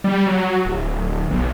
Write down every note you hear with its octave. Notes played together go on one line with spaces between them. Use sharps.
G3
F#3
D1
B1